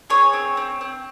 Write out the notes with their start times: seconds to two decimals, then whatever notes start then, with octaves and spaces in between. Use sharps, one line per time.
0.10 G#4 C#5
0.33 C4
0.57 C4
0.81 C4